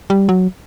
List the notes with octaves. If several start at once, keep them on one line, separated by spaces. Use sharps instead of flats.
G3
F#3